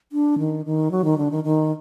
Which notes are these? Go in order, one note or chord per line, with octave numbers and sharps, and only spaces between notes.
D4
D#3
D#3
F#3
D#3
D3
D#3
D#3